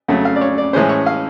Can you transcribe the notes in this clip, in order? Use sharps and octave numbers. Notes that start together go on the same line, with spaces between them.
F2 C#3 F#3 A3 F#5
F5
D5
C#5
D5
A2 E3 G#3 C#4 C5
C#5
F5